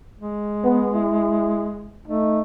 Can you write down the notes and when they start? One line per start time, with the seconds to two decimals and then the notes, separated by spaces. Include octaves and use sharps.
0.20 G#3
0.64 B3
0.94 E4
2.07 A3 D#4